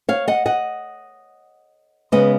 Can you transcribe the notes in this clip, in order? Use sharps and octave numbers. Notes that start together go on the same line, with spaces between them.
C#5 F5
D#5 F#5
D#5 F#5
C#3 G#3 B3 B4 D#5